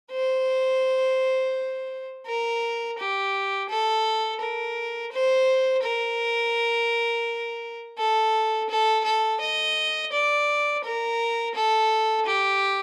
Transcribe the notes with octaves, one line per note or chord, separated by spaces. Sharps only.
C5
A#4
G4
A4
A#4
C5
A#4
A4
A4
A4
D#5
D5
A#4
A4
G4